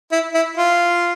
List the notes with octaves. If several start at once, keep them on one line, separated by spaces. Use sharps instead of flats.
E4
E4
F4